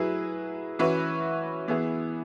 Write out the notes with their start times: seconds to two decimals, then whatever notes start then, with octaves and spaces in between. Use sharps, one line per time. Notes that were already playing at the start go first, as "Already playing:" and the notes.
Already playing: F#3 E4 G#4 B4
0.79 E3 C#4 F#4 B4 E5
1.68 E3 B3 E4 G#4